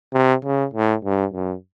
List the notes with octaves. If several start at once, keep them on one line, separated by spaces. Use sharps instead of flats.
C3
C#3
A2
G2
F#2